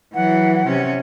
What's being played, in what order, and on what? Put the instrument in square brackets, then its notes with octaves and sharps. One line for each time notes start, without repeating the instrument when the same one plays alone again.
[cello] E3 F#3 [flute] F#5
[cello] C3 C#4